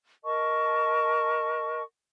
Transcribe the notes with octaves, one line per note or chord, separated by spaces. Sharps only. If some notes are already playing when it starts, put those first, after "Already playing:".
A#4 D#5 A5 C#6